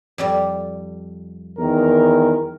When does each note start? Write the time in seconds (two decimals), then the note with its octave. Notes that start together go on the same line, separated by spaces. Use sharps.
0.18 F2 G3 D5
1.58 E2 D#3 A#4